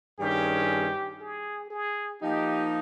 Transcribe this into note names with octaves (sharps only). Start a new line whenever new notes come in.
G2 D#3 G3 C#4 G4 G#4
G#4
G#4
F3 A#3 D#4 G4